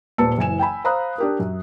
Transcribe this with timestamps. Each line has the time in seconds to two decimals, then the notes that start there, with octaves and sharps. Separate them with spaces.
0.18 D#1 A#2 B4 A5 E6 C#7
0.38 F#1 E3 G#5 E7
0.59 G5 G#5 B5
0.85 C5 F5 A#5 B5 D#6 F#6
1.18 D4 G4 A#4
1.39 F#2